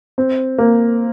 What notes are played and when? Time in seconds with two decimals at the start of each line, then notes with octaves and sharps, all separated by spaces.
0.18 C4
0.58 A#3